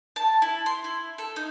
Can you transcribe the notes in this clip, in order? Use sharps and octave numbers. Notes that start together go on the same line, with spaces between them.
A5
E4
C6
E4
A4
D#4